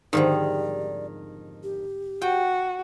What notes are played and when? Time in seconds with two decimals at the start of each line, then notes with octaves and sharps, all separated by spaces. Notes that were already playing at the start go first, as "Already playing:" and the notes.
0.13 F2 G#2 D3 D#3 G3 D5
1.63 G4
2.22 F#4 G5